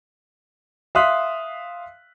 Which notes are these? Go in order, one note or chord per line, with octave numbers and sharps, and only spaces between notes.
E5 F5 C6 D#6 F#6 B6